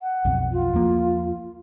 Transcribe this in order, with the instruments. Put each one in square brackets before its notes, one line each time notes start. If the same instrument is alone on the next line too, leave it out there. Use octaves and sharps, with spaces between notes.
[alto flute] F#5
[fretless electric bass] B1 F2 B2
[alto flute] F4
[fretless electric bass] E2 F3 A#3